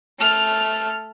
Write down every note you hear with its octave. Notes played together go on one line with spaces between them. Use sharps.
A3 F6